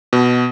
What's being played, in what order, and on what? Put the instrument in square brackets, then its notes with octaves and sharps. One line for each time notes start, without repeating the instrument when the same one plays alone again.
[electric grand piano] B2